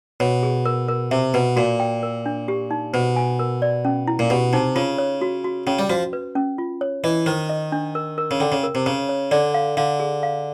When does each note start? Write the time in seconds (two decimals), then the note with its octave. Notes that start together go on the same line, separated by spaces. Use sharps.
0.20 B2 C#5
0.43 G#4
0.66 A#4
0.88 A#4
1.11 C3 E5
1.34 B2 B4
1.56 A#2 F#4
1.80 G5
2.03 A#4
2.26 D4
2.48 G4
2.71 D#4
2.93 B2 C5
3.16 G#5
3.39 A#4
3.62 D5
3.85 C#4
4.08 E4
4.19 A#2
4.30 B2 G4
4.53 C3 D#4
4.75 C#3 F4
4.98 C#5
5.21 F#4
5.44 F#4
5.67 C#3 C#4
5.79 G3
5.90 F3 F#4
6.13 B4
6.35 C#4
6.58 F4
6.81 C#5
7.04 E3 D#5
7.26 D#3 C5
7.50 D#5
7.72 D4
7.95 A#4
8.18 A#4
8.31 C#3
8.40 D3 G5
8.52 C#3
8.63 A#4
8.75 C3
8.86 C#3 C#5
9.09 C#5
9.31 D3 D5
9.54 F5
9.77 D3 F5
10.00 G#4
10.23 F5